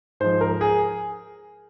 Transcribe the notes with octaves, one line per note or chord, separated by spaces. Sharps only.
G#2 F3 C5
A#4
G#4